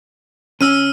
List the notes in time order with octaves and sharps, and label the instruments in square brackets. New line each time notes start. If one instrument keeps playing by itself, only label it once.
[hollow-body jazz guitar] C#3 C#4 [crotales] E6 F6 D#7